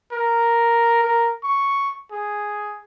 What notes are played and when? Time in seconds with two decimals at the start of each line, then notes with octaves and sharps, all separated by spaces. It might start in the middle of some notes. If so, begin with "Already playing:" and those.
0.12 A#4
1.04 A#4
1.43 C#6
2.11 G#4